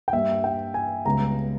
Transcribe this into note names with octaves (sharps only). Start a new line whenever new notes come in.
G5
G2 G3 A#3 E5
G5
G#5
C#2 C#3 G3 B3 A#5